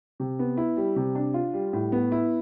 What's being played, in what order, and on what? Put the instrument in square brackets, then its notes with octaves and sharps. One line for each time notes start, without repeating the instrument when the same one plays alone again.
[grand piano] C3
B3
E4
G3
C3
D4
F4
G3
A2
B3
E4